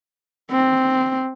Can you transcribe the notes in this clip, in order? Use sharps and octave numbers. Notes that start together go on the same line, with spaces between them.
C4